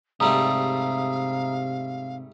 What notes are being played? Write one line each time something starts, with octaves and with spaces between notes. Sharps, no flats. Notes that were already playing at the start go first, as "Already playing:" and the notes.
G#2 C3 G3 A3 F5 A#5 D#6